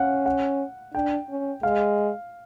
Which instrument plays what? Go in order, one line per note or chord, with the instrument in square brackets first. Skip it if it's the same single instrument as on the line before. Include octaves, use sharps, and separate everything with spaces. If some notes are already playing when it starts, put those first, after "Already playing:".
Already playing: [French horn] C#4 [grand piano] F5 F#5
[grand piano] F#5
[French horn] D4 [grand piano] G5
[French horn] C#4
[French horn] G#3 [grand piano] F5